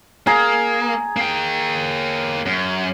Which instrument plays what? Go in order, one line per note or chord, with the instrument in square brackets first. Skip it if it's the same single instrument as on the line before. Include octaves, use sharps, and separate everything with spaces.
[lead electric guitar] A#3 [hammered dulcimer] G#4 G#5 A#5
[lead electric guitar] A#3 G5
F#2